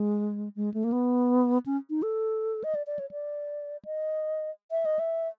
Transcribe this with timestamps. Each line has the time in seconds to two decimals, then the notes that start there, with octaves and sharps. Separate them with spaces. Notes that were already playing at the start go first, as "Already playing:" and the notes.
Already playing: G#3
0.56 G#3
0.74 A3
0.84 A#3
0.92 B3
1.66 C#4
1.90 D#4
2.03 A4
2.64 D#5
2.75 D5
2.87 D5
2.99 C#5
3.11 D5
3.85 D#5
4.71 E5
4.85 D#5
4.99 E5